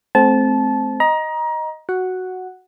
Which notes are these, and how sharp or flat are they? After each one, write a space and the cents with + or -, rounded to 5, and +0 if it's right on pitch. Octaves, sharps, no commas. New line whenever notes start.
A3 -35 C4 +0 A5 -20
D#5 +0 A#5 +25
F#4 +0 F#5 +0